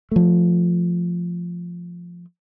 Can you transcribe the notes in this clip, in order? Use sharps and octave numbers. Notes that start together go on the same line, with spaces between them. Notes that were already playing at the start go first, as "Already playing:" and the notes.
F3 A3